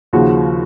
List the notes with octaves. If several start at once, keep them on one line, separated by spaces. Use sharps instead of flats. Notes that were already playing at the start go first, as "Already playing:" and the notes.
D#2 C#3 F3 F#4